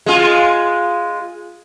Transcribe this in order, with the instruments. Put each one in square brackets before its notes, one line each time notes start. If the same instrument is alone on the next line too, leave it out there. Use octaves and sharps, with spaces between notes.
[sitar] G#3 F4